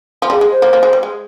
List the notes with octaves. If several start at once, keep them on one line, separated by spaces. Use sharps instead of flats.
F3
G3 G#4
G#3
C5
A#3
A#3
G#3
G3
G#3